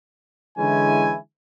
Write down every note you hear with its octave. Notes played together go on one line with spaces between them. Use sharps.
D3 E3 G#3 C#4 E4 G#5